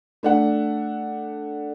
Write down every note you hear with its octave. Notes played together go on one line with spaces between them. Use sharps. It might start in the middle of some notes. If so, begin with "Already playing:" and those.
A3 D4 F#5